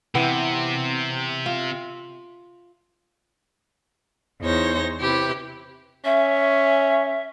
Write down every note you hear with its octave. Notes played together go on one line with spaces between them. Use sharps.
C3 E3 B3 G5
F4
E2 D#4 C5 C#5 A#6
C3 E4 G4 B4
C#4 E5